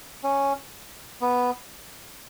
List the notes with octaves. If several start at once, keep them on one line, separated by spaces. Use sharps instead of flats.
C#4
B3